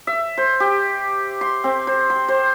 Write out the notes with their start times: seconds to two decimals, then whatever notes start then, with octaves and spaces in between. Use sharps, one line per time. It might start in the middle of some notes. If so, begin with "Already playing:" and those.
0.07 E5
0.37 C5
0.60 G4
1.41 C6
1.64 C4
1.87 C5
2.10 C6
2.28 C5